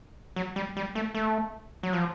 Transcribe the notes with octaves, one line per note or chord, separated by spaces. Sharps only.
F#3
G3
G3
A3
A3
F#3
F3